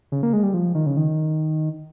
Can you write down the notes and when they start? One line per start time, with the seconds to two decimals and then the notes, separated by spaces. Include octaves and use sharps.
0.12 C#3
0.23 A#3
0.33 G#3
0.43 G3
0.54 F3
0.75 D#3
0.86 C#3
0.97 D#3